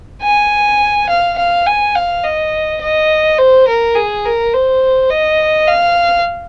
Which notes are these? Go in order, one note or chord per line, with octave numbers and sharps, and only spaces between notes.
G#5
F5
F5
G#5
F5
D#5
D#5
C5
A#4
G#4
A#4
C5
D#5
F5